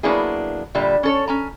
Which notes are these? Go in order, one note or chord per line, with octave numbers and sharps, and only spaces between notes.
F#3 A#3 B3 D4 E4 G#4
A#2 D3 G3 E5
C#4 A4 C#5
C#4 G#5 A#5